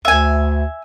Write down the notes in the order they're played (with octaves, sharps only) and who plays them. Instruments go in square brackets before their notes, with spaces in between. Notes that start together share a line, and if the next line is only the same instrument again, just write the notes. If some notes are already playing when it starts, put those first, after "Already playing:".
[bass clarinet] D2 [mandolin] E5 G#5